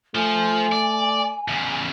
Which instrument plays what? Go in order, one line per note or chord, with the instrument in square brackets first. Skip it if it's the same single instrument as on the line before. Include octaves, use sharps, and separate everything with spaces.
[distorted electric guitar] F3 [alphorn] A3 [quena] G#5
[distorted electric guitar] D5
E2 C#3